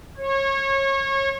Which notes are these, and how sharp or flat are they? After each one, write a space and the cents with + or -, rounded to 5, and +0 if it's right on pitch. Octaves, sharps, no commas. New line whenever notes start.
C#5 -30